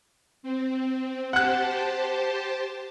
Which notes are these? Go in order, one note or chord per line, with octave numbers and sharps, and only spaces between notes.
C4
G4 C5 F#5 A5 F#6